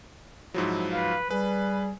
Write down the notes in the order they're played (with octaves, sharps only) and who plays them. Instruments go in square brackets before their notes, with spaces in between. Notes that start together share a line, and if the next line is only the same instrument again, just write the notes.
[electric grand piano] G#2 F3 F#3 [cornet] E4
[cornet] B4 [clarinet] F5
[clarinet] G3 [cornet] G#4 [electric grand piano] B4